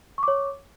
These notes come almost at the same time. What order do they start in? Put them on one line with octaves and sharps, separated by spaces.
C#6 D6 C#5